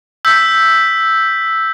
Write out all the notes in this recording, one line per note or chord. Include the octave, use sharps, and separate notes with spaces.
E6 G6 B6